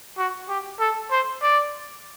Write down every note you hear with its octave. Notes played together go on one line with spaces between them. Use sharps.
F#4
G4
A4
C5
D5